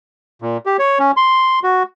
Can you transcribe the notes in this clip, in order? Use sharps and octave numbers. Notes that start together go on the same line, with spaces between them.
A#2
G4
C#5
C#4
C6
F#4